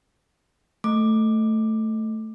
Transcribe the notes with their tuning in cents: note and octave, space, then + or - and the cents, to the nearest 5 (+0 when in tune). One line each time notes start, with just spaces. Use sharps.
A3 +0 D6 +10